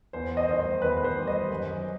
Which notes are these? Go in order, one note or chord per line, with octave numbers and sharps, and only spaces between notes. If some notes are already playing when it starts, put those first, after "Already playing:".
E2 C5
D#5
C5
D#3 G3 D#5
C5
E2 B4
C5
D#3 G3
D#5
F#2